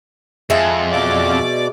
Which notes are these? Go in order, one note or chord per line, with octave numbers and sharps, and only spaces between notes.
F2 G#3 G#4 E5
B2 D5 D6